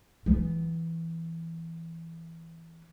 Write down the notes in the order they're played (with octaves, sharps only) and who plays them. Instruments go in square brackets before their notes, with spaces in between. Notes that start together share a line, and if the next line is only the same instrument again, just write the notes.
[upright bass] E3 B3